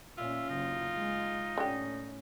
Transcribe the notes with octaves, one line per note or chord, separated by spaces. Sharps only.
A#2 C#4 F4 E5
F#1 D#4
G#3
A2 D3 C#4 G4